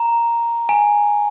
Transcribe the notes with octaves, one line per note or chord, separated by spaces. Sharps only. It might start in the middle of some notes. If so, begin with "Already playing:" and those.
Already playing: A#5
G#5